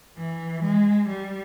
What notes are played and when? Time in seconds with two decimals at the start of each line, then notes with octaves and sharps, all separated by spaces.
0.17 E3
0.63 G#3
1.08 G3